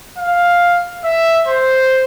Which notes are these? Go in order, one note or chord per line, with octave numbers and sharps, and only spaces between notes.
F5
E5
C5